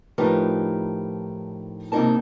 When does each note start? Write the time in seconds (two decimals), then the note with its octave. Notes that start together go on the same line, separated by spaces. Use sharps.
0.18 A2 F3 D#4 G4 A#4 B4
1.92 G#2 C3 A#3 D#4 A#4 A5